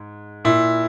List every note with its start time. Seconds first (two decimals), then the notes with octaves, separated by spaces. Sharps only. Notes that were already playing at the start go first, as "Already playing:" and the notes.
Already playing: G#2
0.45 A#2 E4